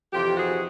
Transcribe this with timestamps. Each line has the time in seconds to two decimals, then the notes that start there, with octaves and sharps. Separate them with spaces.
0.13 F2 C3 E3 F4 G4
0.37 F#4 G#4